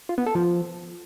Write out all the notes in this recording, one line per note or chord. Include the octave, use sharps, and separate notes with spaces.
F4
B3
A4
F3